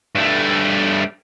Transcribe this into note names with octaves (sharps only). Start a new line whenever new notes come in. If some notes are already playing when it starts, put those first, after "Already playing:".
G2 A3